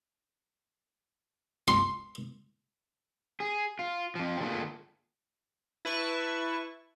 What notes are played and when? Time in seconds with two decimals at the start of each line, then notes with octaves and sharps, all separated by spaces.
1.68 C6
3.40 G#4
3.79 F4
4.15 F2 F3
4.40 D3 A3 A#3 D4 F4 G#4
5.85 E4 B4 A5 C#6